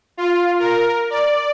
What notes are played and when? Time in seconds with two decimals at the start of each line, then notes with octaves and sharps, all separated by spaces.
0.17 F4
0.60 A#4
1.10 D5